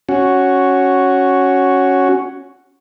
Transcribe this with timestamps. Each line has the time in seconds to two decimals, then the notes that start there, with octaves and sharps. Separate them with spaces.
0.09 C#4 F#4